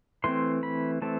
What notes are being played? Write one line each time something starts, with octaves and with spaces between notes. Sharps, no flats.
E3 A3 C4 C6
B5
E3 A3 C4 A5